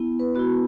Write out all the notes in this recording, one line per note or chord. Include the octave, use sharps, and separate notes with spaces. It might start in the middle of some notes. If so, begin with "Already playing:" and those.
Already playing: B3 E4
B4
B3 E4 F#4